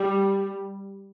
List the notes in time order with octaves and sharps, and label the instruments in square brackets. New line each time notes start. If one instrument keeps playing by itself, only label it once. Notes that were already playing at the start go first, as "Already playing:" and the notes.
Already playing: [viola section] G3